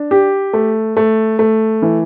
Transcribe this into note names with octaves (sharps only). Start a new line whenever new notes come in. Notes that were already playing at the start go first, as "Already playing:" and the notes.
Already playing: D4
G4
A3
A3
A3
E3